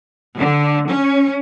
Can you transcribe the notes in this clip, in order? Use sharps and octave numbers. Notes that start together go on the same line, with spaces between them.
D3
C#4